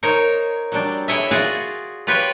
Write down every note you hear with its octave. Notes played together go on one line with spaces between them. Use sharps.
D#4 A#4 C5 C#5
F#3 G3 D4
E4 G#4 C#5 D#5 E5
F4 F#4 G#4 D5 F5
F4 G4 B4 C#5